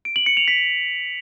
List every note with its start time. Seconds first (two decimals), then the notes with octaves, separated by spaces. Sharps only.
0.05 D7
0.16 F#7
0.26 C#7
0.37 F7
0.48 B6